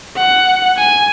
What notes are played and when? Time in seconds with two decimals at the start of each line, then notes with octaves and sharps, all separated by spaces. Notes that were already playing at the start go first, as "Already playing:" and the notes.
0.17 F#5
0.78 G#5